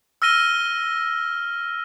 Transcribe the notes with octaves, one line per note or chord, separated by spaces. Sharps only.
E6 F6 A#6 D#7 G7